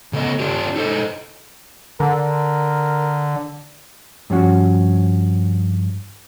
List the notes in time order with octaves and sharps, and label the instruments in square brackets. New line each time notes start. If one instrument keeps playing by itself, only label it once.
[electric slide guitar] C#3 A3 B3 D#5
D4 F4 G4
D#4 A4 C5 D#5
[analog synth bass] D3 [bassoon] A#4
[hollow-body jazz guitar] G2 F3 C#4 F#4